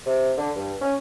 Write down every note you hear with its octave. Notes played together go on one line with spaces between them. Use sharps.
C3
D3
G2
C#4